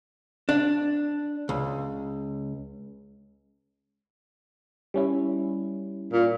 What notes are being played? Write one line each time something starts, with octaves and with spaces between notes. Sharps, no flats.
D4
C#2
G3 C#4 E4
A#2